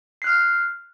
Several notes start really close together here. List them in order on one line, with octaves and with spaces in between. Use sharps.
C7 F#6 F6